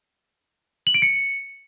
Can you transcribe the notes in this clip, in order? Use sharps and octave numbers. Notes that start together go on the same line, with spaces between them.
F#7
D7
C#7